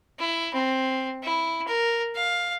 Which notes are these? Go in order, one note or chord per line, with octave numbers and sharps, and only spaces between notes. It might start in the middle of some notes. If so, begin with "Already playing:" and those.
E4
C4
E4
A#4
F5